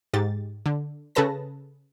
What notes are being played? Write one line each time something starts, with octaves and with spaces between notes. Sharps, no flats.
G#2 G4 A6
D3
C#3 G#4 A4 B4 A5 A#6